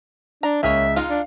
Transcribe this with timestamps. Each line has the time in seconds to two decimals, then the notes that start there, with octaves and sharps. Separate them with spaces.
0.43 D4 A#5
0.63 C#2 A#3 G#4 C#5 E5
0.96 G#3 D#4 F4 F5
1.10 D4